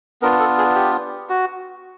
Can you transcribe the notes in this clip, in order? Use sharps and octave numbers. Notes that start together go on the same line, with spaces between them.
B3 D4 F4 A#4
A4
G#4
G4
F#4